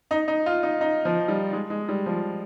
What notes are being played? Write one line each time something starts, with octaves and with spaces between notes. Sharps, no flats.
D#4
D#4
F4
D#4
D#4
F3
G3
G#3
G#3
G3
F3